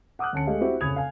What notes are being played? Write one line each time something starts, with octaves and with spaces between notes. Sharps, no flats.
F#5 D6 D#6 F6 F#6
D2 C#4 A5 C#7
G#3 A3 G4 G#4 D#5 F5
C4 E4 F#4 G4 C5 E5
F1 C#3 B5 D#6 G#6 F7
F5 G#5